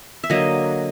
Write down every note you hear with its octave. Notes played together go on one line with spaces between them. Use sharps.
E5
D3 F#3 A#3 D#5